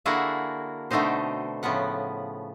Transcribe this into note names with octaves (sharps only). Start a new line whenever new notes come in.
D3 A#3 E4 F#4 G#4 A4
B2 D3 A3 C4 D#4 C5
A2 C#3 F3 B3 F#5